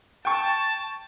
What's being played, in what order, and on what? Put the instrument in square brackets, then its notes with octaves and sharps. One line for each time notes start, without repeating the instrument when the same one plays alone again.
[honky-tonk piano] G5 C#6 [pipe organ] A5